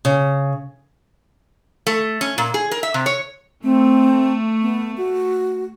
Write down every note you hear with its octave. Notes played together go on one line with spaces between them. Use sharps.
C#3
A3
C#4
A#2
G#4
A#4
E5
C3
C#5
A3 C4
B3
F#4